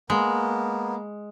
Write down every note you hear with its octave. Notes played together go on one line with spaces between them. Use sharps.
G#3 A#3 B3